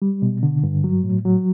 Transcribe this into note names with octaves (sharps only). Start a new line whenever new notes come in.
G3
B2
D3
G2
F#3
A2
F#3